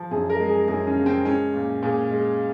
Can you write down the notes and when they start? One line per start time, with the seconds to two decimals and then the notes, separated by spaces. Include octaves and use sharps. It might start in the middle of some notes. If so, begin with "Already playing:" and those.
Already playing: F3
0.11 F#2 G#4
0.30 A#4
0.40 G#3
0.49 G#4
0.68 F#2 G#4
0.87 C#4
0.97 C#3
1.06 C4
1.25 G#3 C#4
1.54 A#2
1.83 A#2 G#4
2.11 G#3